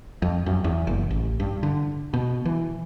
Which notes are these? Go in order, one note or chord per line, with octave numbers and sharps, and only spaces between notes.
F2
F#2
E2
F#1
A1
G2
D3
B2
E3